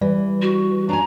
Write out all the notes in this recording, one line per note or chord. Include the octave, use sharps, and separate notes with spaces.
E3 G3
F#4
D4 G#5 A#5